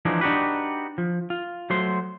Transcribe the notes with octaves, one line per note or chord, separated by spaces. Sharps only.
E3 F3 G#3 D4 D#4
D4 D#4 F#4 G4 B4
F3
F4
F#3 A3 C5 C6